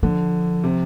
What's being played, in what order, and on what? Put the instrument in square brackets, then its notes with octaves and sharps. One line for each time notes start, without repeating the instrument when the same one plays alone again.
[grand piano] D3 [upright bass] F3
[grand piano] C3